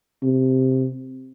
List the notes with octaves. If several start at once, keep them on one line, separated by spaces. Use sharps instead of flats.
C3